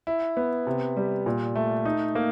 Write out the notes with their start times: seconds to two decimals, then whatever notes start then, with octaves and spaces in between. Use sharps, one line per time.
0.07 E4
0.37 B3
0.67 C3
0.97 G3
1.26 A#2
1.55 A3
1.85 D#4
2.15 A#3